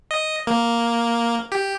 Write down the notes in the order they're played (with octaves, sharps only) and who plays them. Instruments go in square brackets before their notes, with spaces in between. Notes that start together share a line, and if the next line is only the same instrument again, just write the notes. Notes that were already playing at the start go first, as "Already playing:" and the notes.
[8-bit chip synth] D#5
A#3
G4